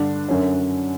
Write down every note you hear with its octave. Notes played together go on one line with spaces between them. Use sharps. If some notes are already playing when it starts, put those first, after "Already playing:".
Already playing: G2 D3 D4
F#2 D3 C#4